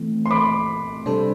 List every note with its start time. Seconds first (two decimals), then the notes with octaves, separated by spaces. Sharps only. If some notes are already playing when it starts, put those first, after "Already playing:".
Already playing: E3 A3 C4
0.26 C6
0.31 B5 D6
1.06 C3 G3 D4 A4 C5